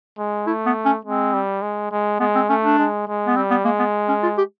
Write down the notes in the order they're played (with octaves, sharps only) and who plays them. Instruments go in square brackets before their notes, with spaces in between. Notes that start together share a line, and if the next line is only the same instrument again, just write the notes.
[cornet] G#3
[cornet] A3 [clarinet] E4
[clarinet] B3
C#4
[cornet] G#3 [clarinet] C4
[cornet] G3
G#3
G#3
[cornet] G#3 [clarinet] B3
[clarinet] C4
[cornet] A3 [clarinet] C#4
[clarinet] D4
[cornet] G#3
G#3
[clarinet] B3
[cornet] G3 [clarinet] C4
[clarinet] B3
[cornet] G#3 [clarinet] A#3
[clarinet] B3
C#4
F4
G4